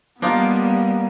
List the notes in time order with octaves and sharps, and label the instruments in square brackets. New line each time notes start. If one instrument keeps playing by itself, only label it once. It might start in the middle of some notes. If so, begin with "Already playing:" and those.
[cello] G3 [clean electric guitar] A#3 [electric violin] B3 [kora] D4 D#4 F4